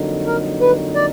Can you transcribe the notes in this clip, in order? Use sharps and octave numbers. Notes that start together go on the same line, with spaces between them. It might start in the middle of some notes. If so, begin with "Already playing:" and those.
Already playing: F2 D3 F#3 A#3 D#4
A#4
B4
D5